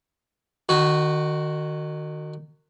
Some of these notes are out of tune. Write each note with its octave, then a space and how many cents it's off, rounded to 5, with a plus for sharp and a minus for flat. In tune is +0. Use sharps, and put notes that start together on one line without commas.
D#3 -30 F#4 +0